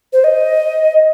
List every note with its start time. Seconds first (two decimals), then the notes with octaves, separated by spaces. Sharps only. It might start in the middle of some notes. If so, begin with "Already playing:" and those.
0.13 C5
0.24 D#5